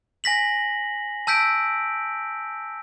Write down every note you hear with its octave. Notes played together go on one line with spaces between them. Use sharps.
G#5 A#6 B6 F#7
A5 E6 G6 B6 D7